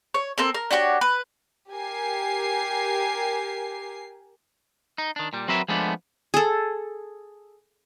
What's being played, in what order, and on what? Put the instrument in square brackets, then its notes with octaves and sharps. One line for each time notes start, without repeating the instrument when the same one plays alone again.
[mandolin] C#5
C4 A4 A#4
A#4
D4 F#4 G4 C#5
B4
[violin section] G4 A#4 G#5 C7
[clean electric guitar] D#4
D#3 D4
A#2 G3
F#3 C4 F#4 A#4 B4 E5
F3 G#3 A3 B3 D4
[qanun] G#4 A4